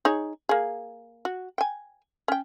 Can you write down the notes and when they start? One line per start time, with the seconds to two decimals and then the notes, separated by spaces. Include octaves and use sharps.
0.05 D#4 G#4 C#5
0.49 A#3 G#4
1.25 F#4
1.58 G5 G#5
2.28 C#4 G5